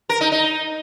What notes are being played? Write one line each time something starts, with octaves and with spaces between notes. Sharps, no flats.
A#4
D#4
D#4